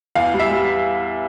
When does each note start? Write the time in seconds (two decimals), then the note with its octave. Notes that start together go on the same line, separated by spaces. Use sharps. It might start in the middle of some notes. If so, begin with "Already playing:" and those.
0.15 E2 F5
0.34 G3
0.39 E5
0.51 G3